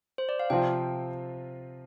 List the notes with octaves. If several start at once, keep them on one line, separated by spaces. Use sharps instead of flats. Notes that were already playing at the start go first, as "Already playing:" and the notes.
C5
D5
F5
C3 F3 C4 F4 G5